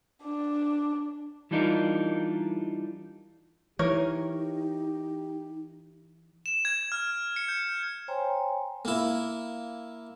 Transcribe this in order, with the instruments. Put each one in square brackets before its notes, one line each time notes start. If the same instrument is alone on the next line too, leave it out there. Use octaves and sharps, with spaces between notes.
[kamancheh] D4
[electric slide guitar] E3 G3 D4 D#4 F4 A#4
[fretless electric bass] E3 [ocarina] D#4 [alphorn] G4 [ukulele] A#4 C#5
[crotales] E7
G#6
F6
C#7
G6
[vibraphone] C5 C#5 G5 G#5 A#5 C6
[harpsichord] A#3 E4